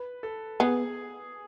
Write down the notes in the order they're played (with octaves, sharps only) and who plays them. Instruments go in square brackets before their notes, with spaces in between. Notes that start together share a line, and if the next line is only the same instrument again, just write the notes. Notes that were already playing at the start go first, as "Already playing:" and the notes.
Already playing: [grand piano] B4
A4
[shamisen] B3 [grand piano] G#4